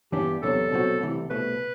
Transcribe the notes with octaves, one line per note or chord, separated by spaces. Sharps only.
G2 E3 B3 D4 G4
E2 C3 F#3 B3 D4 A4
C2 B2 F#3 C4 F#4
C2 C3 E3 A3
C2 B2 A3 B4